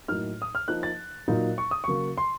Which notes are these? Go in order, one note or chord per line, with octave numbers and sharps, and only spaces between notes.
A2 F#3 A#3 D#4 F6
D#6
F6
F3 A#3 D#4 F#6
A6
A#2 F#3 A#3 D#4
C#6
D#6
C#3 F#3 A#3 C#6
C6